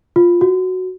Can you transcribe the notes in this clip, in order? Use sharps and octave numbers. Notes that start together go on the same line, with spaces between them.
F4
F#4